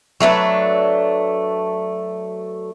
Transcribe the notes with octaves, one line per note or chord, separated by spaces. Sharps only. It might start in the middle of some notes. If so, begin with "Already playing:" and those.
F#3 A3 D4 B4